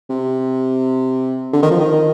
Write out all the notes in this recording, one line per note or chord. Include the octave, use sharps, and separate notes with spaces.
C3
D3
D#3
F3
D#3